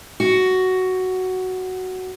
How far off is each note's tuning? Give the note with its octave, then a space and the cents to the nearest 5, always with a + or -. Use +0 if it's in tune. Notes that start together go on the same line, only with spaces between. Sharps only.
F#4 +5